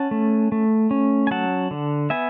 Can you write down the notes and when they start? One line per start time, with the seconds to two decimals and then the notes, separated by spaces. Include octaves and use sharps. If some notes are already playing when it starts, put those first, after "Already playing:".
Already playing: C#4 F#5 A5
0.11 A3
0.52 A3
0.91 C#4
1.27 G#5
1.31 F#3 F#5 A5
1.71 D3
2.10 B3 E5 G#5